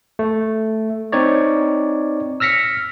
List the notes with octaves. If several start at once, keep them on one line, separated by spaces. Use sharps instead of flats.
A3
C4 D#4 C#5 D5
E6 F6 A#6 B6 C#7